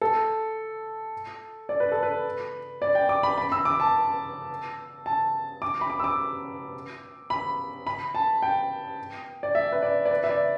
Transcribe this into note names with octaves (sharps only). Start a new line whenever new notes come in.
A4
D5
B4
A4
B4
D5
G5
D6
B5
B5
E6
D6
A5
A5
D6
B5
D6
E6
D6
B5
B5
A5
G5
D5
E5
B4
D5
D5
B4
E5
D5